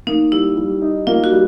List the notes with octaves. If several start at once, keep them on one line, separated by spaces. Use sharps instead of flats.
A#3 D#4
G3 E4
G3
D#4
A#3 F4
F#4
G3